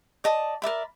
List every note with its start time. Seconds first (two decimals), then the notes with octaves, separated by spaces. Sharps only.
0.24 D5 D#5 A5
0.62 A#4 D5 E5 B5